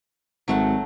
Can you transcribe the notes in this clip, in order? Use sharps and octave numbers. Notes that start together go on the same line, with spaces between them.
G#1 F#3 A3 F#5